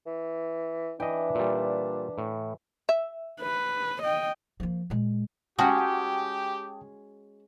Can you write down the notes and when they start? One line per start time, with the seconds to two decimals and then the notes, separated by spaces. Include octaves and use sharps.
0.06 E3
1.00 E3 D4 D#5 G5
1.35 A#2 G3
2.18 A2
2.89 E5
3.41 B4
4.02 D#5 G5
4.60 F3 A#3
4.90 A#2 G#3
5.59 G#3 C#4 F#4 G4 G5 A5 D#6